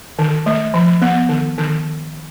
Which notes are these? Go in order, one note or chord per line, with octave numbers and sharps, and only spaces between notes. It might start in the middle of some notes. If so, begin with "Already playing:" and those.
D#3
A3
F3
B3
D#3
D#3